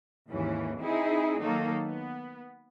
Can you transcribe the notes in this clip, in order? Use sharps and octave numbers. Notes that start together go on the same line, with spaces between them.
D#2 G#2 E3 C#4
C4 D#4 E4 G#4
D#3 F#3 A#3 D#4 A4
B3